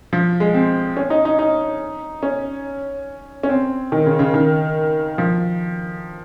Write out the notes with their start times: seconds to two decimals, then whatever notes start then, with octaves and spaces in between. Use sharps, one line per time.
0.13 F3
0.40 G#3
0.54 C4
0.97 C#4
1.10 D#4
1.25 D#4
1.39 D#4
2.23 C#4
3.43 C#4
3.49 C4
3.92 D#3
4.06 C#3
4.19 C#3
4.34 D#3
5.18 F3